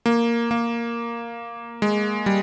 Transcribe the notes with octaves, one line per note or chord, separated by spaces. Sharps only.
A#3
A#3
G#3
G3